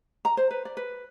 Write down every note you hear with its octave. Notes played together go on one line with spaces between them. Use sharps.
A#5
C5
B4
D5
B4